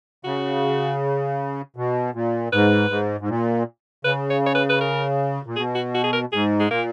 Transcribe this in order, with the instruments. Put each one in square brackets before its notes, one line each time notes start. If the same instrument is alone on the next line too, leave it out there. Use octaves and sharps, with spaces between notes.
[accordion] C#3 [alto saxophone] F#4
[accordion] B2
A#2
[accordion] G#2 [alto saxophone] B4
[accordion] G#2
G#2
A#2
[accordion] C#3 [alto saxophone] B4
[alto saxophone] C#5
C#5
B4
B4
A#4
[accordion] A#2
[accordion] B2 [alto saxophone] G#4
[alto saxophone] F#4
F#4
G#4
A#4
[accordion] G#2 [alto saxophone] G#4
[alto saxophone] G#3
[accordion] A#2 [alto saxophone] A#3